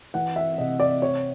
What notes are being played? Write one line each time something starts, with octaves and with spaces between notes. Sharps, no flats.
E3 F#5
E5
C3 D#5
D5
C4 C#5